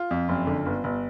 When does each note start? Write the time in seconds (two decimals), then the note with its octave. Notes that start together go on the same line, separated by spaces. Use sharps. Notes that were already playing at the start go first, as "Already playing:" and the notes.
Already playing: F4
0.11 F2
0.29 F#1
0.47 D3
0.66 G1
0.84 G1